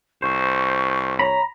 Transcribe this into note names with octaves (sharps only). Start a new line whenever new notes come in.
C2 C5 C#6
C#5 A#5 B5